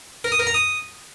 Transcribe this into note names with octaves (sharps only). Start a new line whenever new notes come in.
A#4
D#6
A#4
A#5
D#6